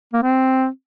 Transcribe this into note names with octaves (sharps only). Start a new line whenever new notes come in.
A#3
C4